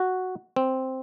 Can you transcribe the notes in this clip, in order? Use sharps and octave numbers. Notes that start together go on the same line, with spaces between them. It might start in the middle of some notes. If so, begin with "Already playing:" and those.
Already playing: F#4
C4